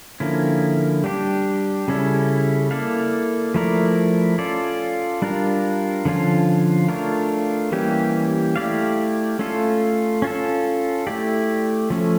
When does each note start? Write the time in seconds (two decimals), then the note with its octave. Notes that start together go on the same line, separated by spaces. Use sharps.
0.20 D3 F3 A#3 C#4 E4
1.04 G3 D4 G4
1.88 C#3 G3 C#4 E4 A4
2.71 A#3 E4 A4 D5 F5
3.54 F3 A3 E4 A#4 D5
4.38 C#4 F4 A4 D5
5.22 G3 D4 F4 A#4
6.05 D3 F3 C#4 F4
6.89 A3 D4 F4 A#4 C#5
7.72 E3 G3 A#3 C#4 G4
8.56 A3 E4 G4 D5 F5
9.39 A3 C#4 F4 A4
10.22 C#4 F4 A4
11.07 A3 E4 G4 D5
11.90 F3 A3 C#4